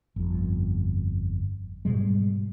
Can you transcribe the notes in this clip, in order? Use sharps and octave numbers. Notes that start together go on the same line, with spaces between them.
G1 F2
G#2 B2 G3 G#3